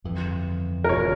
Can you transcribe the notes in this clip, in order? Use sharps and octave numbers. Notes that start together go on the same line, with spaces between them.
G1 F2 E3
A#4
E1 D2 C#3 C#5